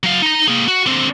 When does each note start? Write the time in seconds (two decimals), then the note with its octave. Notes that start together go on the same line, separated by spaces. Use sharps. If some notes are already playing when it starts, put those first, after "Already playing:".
0.03 F#3 F5
0.22 D#4 A#5
0.48 A#3 G#4
0.68 F#4
0.86 D3 C4